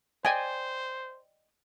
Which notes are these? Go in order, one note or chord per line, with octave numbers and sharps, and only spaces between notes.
C5 D5 D#5 G5 G#5